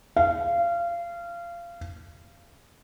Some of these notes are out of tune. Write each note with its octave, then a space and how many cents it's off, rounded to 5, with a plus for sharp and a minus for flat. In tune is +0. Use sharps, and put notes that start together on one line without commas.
F5 -25